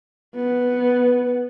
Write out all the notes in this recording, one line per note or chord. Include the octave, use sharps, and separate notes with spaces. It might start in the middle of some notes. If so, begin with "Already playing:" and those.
B3